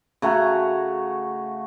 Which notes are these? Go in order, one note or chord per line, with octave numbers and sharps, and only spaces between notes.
C#3 A3 F#4 A#5